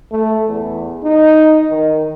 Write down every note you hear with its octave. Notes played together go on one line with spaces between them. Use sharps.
A3
E2
D#4
D#3